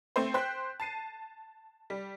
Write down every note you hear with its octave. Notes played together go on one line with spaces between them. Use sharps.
A3 C4 C5
C5 G5 F#6 G6 B6
A5 C7 D#7
G3